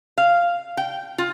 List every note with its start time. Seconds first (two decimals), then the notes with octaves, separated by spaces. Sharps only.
0.18 F5
0.77 G5
1.18 F4